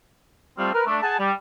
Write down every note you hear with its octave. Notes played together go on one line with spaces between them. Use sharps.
G3 A3 C4 F4
A#4 B4
A3 D4
G#4 F#5 G#5 A5
G3